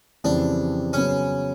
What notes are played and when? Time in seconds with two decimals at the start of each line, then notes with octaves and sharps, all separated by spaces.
0.24 F2 C#3 E3 G3 D4
0.93 C#3 F#3 B3 C#4